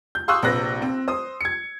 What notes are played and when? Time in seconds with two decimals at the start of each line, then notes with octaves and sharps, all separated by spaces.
0.15 G6
0.28 F5 C6 C#6 D#6 E6 F#6
0.43 A#1 C3 B4 F#6 A#6
0.82 C4
1.08 C5 D#6
1.41 G#6 C#7